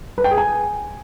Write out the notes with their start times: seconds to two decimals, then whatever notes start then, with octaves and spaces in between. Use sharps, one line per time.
0.18 B4
0.24 G5
0.31 G#4
0.38 G#5